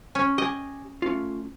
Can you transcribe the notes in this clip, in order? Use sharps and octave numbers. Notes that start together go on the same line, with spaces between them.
C#4
G4 D#5 G#5
A3 C#4 F4